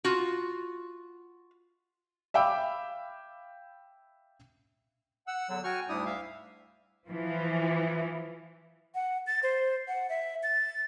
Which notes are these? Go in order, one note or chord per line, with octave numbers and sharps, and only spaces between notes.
F4 F#4
E5 F5 G5 B5 D6 E6
F#5 E6
E2 D3 F#3
F#4 G5 G#5 C#6 F6
D2 G#2 G3 D4 E4 D#6
E5 F5
E3 F3
F#5
A6
C5
F#5
E5
A6